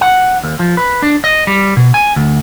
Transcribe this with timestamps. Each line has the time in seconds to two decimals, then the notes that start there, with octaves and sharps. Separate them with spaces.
0.01 F#5
0.43 D#2
0.59 F3
0.77 B4
1.02 D4
1.24 D#5
1.47 G3
1.77 B2
1.94 G#5
2.16 D2